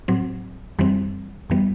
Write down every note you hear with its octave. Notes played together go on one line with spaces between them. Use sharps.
A2 F#3 C4
F#2 E3 G3 C4
F#2 E3 G3 B3